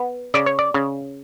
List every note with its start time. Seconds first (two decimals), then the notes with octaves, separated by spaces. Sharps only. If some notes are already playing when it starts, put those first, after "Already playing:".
Already playing: B3
0.34 C#3 D5
0.46 C#5
0.59 D5
0.74 C#3